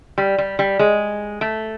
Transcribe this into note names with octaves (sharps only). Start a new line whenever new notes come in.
G3
G3
G3
G#3
A3